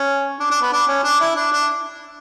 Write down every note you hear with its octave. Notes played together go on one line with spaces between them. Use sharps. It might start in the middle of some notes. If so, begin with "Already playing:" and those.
Already playing: C#4
D4
D4
B3
D4
C#4
D4
E4
D4
D4